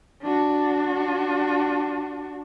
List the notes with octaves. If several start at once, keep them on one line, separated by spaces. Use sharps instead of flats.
D4 F#4